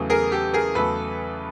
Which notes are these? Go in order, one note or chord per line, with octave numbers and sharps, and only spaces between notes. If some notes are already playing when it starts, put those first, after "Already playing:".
Already playing: E2 C#3 F#3 A3
G#4 A#4
G4 A4
G#4 A#4
E2 C#3 F#3 A3 A4 B4